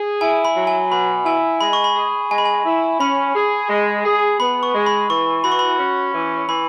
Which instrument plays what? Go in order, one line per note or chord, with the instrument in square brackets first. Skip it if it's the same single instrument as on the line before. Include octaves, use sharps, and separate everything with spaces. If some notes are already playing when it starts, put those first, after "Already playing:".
Already playing: [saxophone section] G#4
[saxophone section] E4 [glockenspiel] G#5
[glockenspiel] B5
[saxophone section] F#3
[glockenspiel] G#5
[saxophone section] B2 [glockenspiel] B5
[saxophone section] E4 [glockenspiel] G#5
[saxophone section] G#3 [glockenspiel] B5
[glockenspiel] C#6
B5
[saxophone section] G#4
[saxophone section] G#3 [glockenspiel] G#5
[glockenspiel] B5
G#5
[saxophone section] E4
[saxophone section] C#4 [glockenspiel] B5
[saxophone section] G#4
G#3
G#4
[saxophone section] B3 [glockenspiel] B5
[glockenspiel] C#6
[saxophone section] G#3
[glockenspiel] B5
[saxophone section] E3 [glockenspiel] C#6
[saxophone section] F#4 [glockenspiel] B5
[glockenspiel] C#6
B5
[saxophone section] C#4
E3
[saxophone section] E3 [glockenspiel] B5